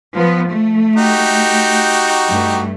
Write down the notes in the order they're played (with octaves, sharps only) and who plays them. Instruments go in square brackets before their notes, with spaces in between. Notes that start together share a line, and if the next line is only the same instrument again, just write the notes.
[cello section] F3 B3
A3
[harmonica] D#4 F#4 G4
[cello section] G2 A3